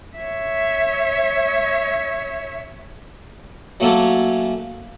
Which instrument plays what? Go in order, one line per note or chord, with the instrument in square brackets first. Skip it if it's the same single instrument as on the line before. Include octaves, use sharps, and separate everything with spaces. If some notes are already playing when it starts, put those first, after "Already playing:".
[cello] C#5 E5
[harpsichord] F#3 A3 A#3 C#4 A4